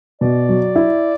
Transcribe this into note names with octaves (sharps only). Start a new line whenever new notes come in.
B2 D5
F#3
E4